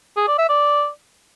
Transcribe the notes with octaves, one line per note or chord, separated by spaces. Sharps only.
G#4
D5
E5
D5